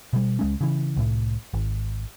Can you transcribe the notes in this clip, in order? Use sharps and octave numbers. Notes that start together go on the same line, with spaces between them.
B2 G3
C#2 G#3 C#4
C#3 E3
C2 A2
G#1